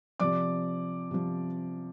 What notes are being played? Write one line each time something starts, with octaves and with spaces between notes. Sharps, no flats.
C3 F3 D5 D6
C3 F3